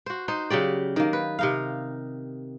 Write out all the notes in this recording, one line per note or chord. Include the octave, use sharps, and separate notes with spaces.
F#4 C5
D#4 C5
C#3 F#3 G4 D5
D#3 A#3
B4
C3 D#4 F5